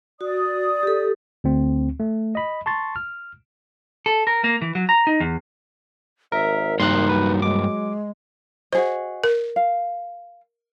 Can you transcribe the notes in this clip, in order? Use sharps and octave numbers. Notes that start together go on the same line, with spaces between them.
F#4 D5 D#6
G4 A4
D2 C4
A3
D#5 B5
A5 C6 C#6 A6
F6
A4
A#4
A#3
E3
F#3
A#5
D#4
E2
G#1 A#4 E5
G2 A#3 D#4 C6 F#6
F#3 B4
G#3 D6
F#4 G#4 C5 D#5
A#4
F5